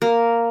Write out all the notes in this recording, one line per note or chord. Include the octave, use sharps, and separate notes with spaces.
A#3